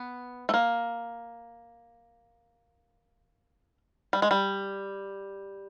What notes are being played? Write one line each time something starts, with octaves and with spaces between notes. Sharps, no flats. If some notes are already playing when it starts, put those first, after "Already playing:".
Already playing: B3
A3
A#3
G3
G#3
G3